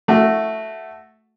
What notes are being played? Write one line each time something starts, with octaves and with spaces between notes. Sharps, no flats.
A3 F#4